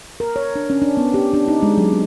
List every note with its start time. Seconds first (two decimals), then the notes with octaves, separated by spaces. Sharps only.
0.20 A#4
0.36 C#5
0.56 D4
0.70 C#4
0.82 D4
0.97 B3
1.14 G4
1.33 D4
1.48 D#4
1.63 G#3
1.77 F#3
1.92 C4